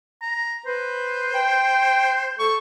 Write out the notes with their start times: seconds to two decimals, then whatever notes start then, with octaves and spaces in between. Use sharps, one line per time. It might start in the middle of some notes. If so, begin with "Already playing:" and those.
0.22 A#5
0.66 B4 C5
1.34 G5
2.39 A4 C#6